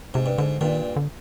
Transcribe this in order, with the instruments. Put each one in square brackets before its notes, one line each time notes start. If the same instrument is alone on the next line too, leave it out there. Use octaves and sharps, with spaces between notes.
[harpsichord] G#2 [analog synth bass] C3
[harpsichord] G2
[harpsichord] G#2 [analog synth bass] D3
[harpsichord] G2 A#2 [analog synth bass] D#3
[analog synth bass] D3